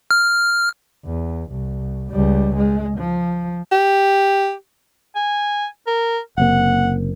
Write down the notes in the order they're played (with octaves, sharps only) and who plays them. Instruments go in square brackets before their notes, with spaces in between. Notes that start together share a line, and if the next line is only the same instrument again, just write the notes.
[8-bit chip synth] F6
[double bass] E2
C2
C#2 G3
G#3
F3
[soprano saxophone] G4
G#5
A#4
[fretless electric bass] F#1 C3 A#3 [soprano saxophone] F#5